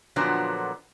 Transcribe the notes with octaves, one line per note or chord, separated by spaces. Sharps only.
A#2 D3 F3 F#3 B3 D4